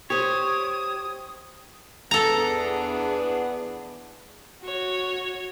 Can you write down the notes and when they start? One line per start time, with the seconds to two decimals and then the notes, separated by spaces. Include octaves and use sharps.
0.10 G4 C5 C#5 D#6
2.11 E2 B3 D4 G#4 A4 A#5
4.62 F#4 C#5